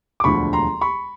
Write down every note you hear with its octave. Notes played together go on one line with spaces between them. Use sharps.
D6
E1 D2 D3 F3 B5 C#6
A#5 C6
B5 C#6